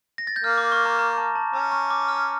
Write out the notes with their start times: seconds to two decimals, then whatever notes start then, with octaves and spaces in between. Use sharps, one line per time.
0.18 A#6
0.27 A6
0.36 G6
0.44 A#3 F6
0.58 D6
0.72 C#6
0.86 A#5
0.99 A#5
1.18 A5
1.35 A5
1.53 C#4 A#5
1.72 C#6
1.90 D6
2.08 F6